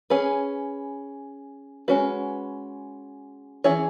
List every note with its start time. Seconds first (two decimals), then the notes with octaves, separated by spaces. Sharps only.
0.10 C#4 G#4 B4
1.88 G#3 C#4 F#4 B4
3.64 E3 C#4 E4 G#4 C#5